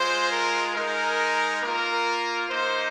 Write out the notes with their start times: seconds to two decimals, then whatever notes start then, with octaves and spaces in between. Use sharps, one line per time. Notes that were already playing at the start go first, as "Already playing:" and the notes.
Already playing: G#3 F4 C5
0.29 A#4
0.74 G#3 D#4 A#4
1.61 A#3 F4 A#4
2.49 A#3 D#4 C5